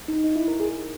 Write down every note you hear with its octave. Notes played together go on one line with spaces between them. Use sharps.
D#4
D#4
E4
A#4
G#4